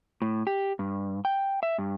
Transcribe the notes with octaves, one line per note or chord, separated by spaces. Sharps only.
A2
G4
G2
G5
E5
G2